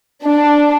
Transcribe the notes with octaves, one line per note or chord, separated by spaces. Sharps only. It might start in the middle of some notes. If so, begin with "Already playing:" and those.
D4